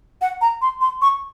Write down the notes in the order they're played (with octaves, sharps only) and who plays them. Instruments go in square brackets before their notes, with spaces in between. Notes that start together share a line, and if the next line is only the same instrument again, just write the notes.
[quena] F#5
A#5
C6
C6
C#6